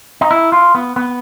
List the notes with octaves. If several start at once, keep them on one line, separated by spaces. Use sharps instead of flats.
D#4
E4
F4
B3
B3